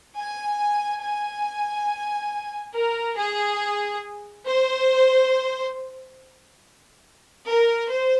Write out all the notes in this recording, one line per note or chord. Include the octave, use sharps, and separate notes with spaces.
G#5
G#5
A#4
G#4
C5
A#4
C5